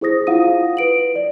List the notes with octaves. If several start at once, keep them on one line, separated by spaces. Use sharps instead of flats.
E4 G#4 C5 D#6 A#6
E4 F4 F5 F#5 D#6 D#7
B4 D7 F#7
D5